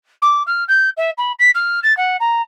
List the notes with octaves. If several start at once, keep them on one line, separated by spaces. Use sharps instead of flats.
D6
F6
G6
E5
B5
B6
F6
A6
F#5
A#5